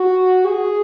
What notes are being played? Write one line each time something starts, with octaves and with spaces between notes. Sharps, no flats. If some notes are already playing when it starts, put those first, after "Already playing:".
Already playing: F#4
G#4